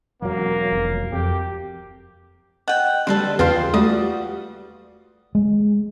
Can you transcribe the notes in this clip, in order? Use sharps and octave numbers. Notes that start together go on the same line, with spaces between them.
E1 F#2 F#3 A#3
F1
F2 G4
D#5 F#5 G5
D3 G3 A4 B4 C5
E2 C#3 F4 B4 F5 G5 C6
G3 A3 F4 F#4 D5 D#6
G#3